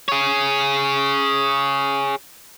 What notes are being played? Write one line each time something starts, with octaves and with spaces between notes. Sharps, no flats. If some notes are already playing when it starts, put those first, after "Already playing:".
G#4 C#5